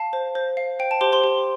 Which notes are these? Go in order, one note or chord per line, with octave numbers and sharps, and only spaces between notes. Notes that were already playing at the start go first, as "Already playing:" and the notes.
Already playing: F5 A5
C5
C5
F5
C5 G5
A5
G4 C5 C6
C5 C6
G4